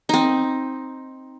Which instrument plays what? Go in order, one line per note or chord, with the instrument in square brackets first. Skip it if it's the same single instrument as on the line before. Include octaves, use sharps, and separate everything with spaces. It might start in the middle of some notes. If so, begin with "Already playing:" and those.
[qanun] C4 D#4